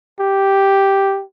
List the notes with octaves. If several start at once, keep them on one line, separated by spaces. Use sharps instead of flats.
G4